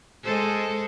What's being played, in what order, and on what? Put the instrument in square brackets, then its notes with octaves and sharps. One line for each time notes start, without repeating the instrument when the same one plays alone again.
[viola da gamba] G#3 A4 C5